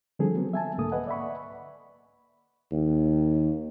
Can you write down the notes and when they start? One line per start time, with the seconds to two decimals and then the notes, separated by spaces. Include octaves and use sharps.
0.19 D3 F3 G3 C4 G#4 A4
0.35 F#3 B3 C4
0.53 E5 G#5 A5
0.78 C2 G#2 D3 A#3 A4 D#6
0.92 B4 D#5 F#5 G#5
1.07 D5 E5 F#5 B5 C#6
2.71 D#2